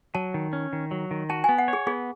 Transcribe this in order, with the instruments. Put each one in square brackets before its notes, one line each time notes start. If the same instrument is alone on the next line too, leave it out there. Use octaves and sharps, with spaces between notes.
[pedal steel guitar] F#3 [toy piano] A5
[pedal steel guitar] D#3
C#4
D#3
F#3
D#3
[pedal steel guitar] F#4 [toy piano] A5
[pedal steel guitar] B3 [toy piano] G#5
[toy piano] F#5
[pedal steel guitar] C#5
[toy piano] G#4
[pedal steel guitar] B3 [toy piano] G#4